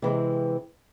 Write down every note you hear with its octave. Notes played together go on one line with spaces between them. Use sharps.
C3 E3 G#3 C4